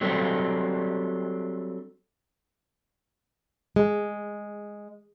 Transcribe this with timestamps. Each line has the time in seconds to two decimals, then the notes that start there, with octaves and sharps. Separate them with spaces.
0.01 F#3 G3 C4 D4 G4 A4
3.76 G#3